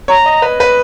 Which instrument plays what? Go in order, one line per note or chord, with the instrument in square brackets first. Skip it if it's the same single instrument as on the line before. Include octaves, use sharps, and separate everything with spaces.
[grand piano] C#5 [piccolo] A#5
[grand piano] D#5
B4
B4